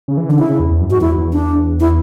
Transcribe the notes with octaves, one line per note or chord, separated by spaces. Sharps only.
C#3
E3
D3 D4
C#3 E4
C#3
E2
E2
F#2
G#2 F#4
E2 E4
E2
D4
E4